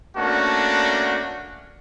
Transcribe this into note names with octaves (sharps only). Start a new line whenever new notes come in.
A3 A#3 C#4 D4 F#4